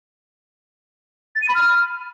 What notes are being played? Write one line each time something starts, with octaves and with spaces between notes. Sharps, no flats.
A6
D#7
B5
F6